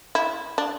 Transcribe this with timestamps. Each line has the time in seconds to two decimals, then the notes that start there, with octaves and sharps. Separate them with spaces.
0.15 E4
0.58 D4